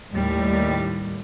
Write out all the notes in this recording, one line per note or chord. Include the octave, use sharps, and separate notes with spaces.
D#2 A2 G3